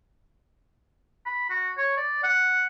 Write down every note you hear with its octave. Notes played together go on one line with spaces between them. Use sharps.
B5
F#4
C#5
D5
F#5